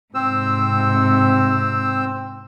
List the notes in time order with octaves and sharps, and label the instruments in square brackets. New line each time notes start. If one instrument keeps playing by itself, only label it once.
[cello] G#2 C3 [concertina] C4 C5 E6